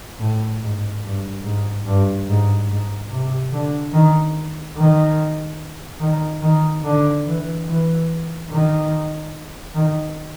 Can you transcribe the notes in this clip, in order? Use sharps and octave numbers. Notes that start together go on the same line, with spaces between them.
A2
G#2
G2
G#2
G2
G#2
G#2
C3
D3
D#3
D#3
D#3
D#3
D3
E3
E3
D#3
D#3